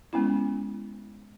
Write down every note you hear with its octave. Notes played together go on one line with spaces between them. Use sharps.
G#3 B3 C#4 E4